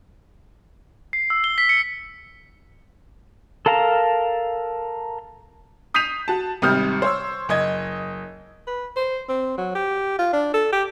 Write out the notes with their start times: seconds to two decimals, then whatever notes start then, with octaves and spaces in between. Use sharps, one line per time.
1.13 C7
1.30 E6
1.44 G7
1.58 B6
1.69 C#7
3.66 A4 A#4 F5 A5 A#5
5.94 D#6 G6 B6 C7 D#7 F7
6.28 F#4 A5
6.62 G#1 C3 G3 D#6 F6 G6
7.02 C5 C#5 E6
7.49 F#1 D#5 G#6
8.67 B4
8.96 C5
9.29 C4
9.58 F#3
9.75 G4
10.19 F4
10.33 D4
10.54 A4
10.72 G4